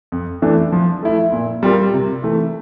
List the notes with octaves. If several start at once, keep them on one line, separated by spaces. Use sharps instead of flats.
F2
E3 A3 D4
F3
A3 E4
A#2
G3 C4 F4 A#4
C3
E3 A3